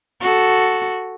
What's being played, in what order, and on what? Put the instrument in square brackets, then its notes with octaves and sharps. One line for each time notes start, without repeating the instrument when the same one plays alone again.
[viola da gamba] F#4 A4